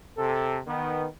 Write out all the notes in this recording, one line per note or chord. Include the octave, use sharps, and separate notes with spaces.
C3 A4
D#3 B3